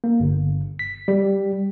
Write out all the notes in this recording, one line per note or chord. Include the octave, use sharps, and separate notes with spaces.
A#3
G1
B6
G3